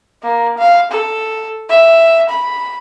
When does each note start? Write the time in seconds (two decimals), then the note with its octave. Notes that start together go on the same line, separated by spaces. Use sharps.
0.23 A#3
0.58 F5
0.91 A4
1.70 E5
2.29 B5